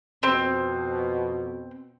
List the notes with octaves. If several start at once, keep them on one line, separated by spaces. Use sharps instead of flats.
F2 B2 C4